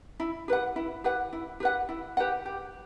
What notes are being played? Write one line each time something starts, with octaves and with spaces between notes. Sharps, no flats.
E4
G4 B4 F#5
E4
G4 B4 F#5
E4
G4 B4 F#5
E4
G4 B4 F#5
G4